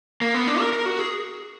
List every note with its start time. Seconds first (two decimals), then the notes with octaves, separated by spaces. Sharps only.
0.21 A#3
0.34 B3
0.47 D4
0.60 A#4
0.73 A#4
0.85 F#4
0.99 G#4